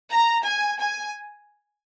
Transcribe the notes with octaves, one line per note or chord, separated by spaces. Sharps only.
A#5
G#5
G#5